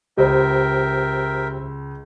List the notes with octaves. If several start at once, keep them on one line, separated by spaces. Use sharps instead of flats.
C#2 G4 A#4 C5 D#5 E5 G5